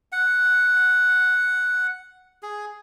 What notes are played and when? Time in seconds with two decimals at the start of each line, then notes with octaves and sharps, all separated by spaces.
0.12 F#5
2.43 G#4